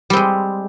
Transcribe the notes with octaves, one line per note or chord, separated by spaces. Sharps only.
G3 G#3 C4